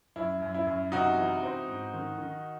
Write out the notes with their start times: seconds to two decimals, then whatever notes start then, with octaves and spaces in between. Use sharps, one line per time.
0.16 F#2 E4
0.42 F#2
0.55 E4
0.67 F#2
0.92 C3 D#4 F#4
1.17 E3
1.43 C4
1.68 G#2
1.94 D#3
2.18 D#3